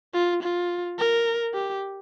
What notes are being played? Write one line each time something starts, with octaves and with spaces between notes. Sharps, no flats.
F4
F4
A#4
G4